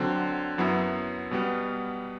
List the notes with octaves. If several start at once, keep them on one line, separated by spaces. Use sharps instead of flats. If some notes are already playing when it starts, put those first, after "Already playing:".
Already playing: D3 F#3 C4
F#2 F#3 B3 E4
B2 G3 B3